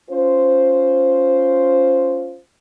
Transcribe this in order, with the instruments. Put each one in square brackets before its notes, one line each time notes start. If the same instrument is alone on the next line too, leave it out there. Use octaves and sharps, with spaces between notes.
[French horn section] C#4 F4 C5